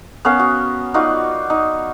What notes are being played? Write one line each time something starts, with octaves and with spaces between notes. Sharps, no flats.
B3 C#4 A#4 F5
F#4
D#4 F4 F#4 D5
D#4